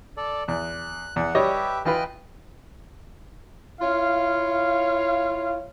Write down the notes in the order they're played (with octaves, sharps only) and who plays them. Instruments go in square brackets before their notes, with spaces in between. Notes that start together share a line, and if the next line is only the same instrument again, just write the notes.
[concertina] A4 D5
[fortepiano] E2 [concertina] F#6
[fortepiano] E2 [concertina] F#5
[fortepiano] G3 C#5 D#5 [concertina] G4 B4 E5
[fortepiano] E3 F4 B4 [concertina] D#5 G5
[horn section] E4 F4 C#5 F5